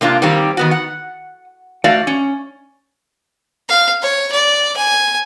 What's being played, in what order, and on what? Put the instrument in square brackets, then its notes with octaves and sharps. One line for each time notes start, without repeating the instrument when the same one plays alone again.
[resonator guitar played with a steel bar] C3 A#3 D4 F4
D#3 G3 A#3 C4 G4
D#3 B3 F#4
F#5
A3 F#4 D5 F5
C#4
[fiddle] F5
C#5
D5
G#5